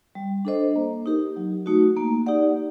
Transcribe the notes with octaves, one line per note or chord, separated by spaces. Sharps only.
G3
D4 A4 C5 D#5
A#3
D#4 G4 A#4
F#3
A3 D#4 F#4
A#3
D#4 G4 D5 F#5